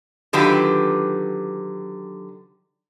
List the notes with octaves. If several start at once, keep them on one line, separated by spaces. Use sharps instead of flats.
D3 D#3 F#3 F4 G4 B4